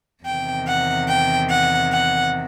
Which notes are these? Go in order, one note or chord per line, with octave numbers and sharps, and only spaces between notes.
E2 C3 D#3 G5
F#5
G5
F#5
F#5